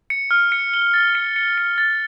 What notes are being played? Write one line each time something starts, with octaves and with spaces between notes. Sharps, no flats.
C#7
F6
C#7
G7
A6
C#7
C#7
C#7
A6